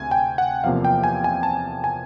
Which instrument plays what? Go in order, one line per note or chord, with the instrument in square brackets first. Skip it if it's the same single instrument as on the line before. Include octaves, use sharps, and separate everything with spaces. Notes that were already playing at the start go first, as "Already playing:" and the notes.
Already playing: [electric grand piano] D2 C3 G#5
G5
F#5
E2 C3 F3 A#3 F5
G5
G#5
G#5
A5
G#5